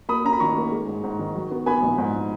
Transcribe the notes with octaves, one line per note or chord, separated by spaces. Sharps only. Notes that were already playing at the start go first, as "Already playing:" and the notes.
A#3 B5 D#6
C#4 A#5
B5
D#3 A#5 C#6
A#3
G#3
G#2
G#2
D#3
F#3
B3
B3 G#5 B5
A#1
G#2